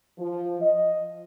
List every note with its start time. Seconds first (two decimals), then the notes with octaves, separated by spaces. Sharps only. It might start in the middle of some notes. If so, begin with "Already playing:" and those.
0.18 F3
0.61 D#5